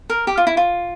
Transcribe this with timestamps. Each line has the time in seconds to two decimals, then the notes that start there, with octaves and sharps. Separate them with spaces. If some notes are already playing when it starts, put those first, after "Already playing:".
0.10 A#4
0.27 G4
0.37 F4
0.47 E4
0.57 F4